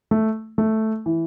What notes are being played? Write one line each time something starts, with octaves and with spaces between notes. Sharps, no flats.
A3
A3
E3